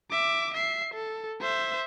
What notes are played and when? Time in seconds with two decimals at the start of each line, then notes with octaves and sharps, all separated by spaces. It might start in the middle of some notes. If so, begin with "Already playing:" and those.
0.11 E5 D6
0.54 E5 C7
0.94 A4
1.41 C5 E5